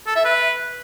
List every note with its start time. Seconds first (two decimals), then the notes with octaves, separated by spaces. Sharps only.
0.07 A4
0.16 E5
0.25 B4